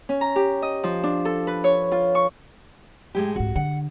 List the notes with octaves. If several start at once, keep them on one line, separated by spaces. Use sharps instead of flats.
C#4
A#5
G4
D#5
F3
D4
A4
B4
C#5
F4
C#6
A2 G#3 G4
C2 G#2 F#4
D3 F#5